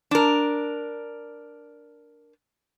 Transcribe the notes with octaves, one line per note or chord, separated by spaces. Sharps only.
D4 A#4